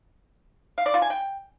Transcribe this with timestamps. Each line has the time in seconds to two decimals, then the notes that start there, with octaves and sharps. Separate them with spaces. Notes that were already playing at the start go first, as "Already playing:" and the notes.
0.78 F5
0.86 D5
0.94 F4
1.02 G#5
1.10 G5